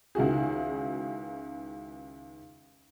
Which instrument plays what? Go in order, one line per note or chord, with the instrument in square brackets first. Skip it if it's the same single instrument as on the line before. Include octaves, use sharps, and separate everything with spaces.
[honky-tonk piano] C#2 D#3 E4 F#4 G#4